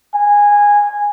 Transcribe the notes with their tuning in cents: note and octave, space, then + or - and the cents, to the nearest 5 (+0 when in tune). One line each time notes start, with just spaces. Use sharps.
G#5 -15